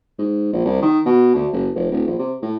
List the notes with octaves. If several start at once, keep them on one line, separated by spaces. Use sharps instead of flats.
G#2
A#1
C2
D#3
B2
D2
F#1
F1
D#1
A#1
C3
A2